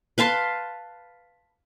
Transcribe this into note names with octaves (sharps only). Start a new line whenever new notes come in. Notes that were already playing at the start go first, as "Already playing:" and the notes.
B4 F5 A5 C6